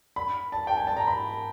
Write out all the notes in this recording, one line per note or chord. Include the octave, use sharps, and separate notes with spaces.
B5
A5
G5
G#5
A5
A#5
B5